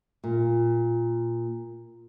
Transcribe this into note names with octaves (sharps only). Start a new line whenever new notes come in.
A#2